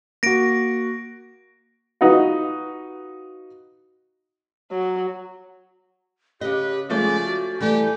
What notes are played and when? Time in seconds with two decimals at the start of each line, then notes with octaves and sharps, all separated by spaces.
0.23 A#3 F#4 A#6 D7
2.01 D#4 F4 F#4 B4 F#5
4.71 F#3
6.41 C#3 G4 B4 D#5
6.90 F3 G#3 A3 C#4 D5
7.24 F#4
7.61 E3 G3 A3 G4 G#5